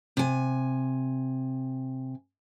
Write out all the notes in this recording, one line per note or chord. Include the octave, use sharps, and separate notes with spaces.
C3 G#5